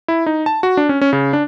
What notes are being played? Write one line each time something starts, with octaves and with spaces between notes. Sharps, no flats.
E4
D#4
A5
F#4
D4
C#4
C#4
C#3
D4